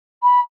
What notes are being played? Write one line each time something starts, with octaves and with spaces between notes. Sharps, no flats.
B5